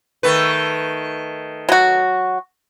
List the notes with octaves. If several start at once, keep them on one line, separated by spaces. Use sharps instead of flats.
D#3 A3 B4
F#3 F#4